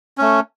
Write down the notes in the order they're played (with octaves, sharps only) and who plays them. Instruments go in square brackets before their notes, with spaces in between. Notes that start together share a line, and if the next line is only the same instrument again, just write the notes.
[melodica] A3 C#4